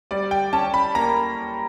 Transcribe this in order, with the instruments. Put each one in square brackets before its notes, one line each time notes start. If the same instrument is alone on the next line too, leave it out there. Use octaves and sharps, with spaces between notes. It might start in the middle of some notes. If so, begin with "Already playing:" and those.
[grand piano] G3 D5
G5
C#4 A5
B5
A#3 A#5